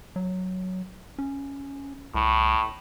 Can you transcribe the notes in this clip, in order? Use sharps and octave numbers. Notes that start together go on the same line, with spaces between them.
F#3
C#4
C2 A2